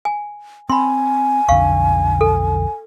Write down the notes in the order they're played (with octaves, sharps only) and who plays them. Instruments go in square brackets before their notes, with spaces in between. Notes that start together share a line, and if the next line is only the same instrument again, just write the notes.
[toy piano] G#5
[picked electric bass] C4 [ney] G#5 [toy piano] B5 C6
[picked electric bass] B1 F2 D3 [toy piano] F5 C#6
[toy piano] A4